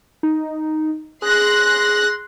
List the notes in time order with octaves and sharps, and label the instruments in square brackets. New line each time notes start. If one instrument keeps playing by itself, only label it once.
[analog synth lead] D#4
[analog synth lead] G#4 [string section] C6 F#6 A#6